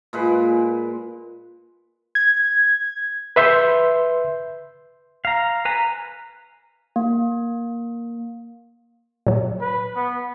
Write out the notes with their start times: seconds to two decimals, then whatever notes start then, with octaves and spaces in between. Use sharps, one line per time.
0.13 A#2 G#3 B4
2.15 G#6
3.36 B4 E5 C6 G6
5.25 F5 A#5
5.65 B4 G#5 A#5
6.96 A#3
9.27 A#2 F#3
9.61 B4
9.95 B3